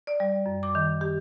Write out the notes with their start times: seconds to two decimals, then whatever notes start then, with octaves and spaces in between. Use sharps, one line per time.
0.07 D5
0.20 G3
0.46 F#2
0.63 D6
0.75 D#3
1.01 G4